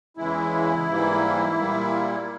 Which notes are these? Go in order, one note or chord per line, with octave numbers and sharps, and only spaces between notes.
E2 C#3 E3 G#3 E4
G#2 E3 G3 A#3
A#2 G3 A#3